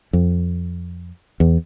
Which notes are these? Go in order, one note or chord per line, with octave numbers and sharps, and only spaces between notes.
F2
E2